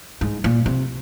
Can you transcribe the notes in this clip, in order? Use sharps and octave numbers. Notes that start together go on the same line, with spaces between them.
G#2
A#2
C3